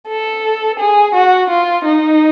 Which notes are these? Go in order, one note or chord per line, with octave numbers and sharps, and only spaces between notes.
A4
G#4
F#4
F4
D#4